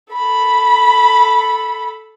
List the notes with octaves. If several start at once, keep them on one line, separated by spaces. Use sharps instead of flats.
A4 B5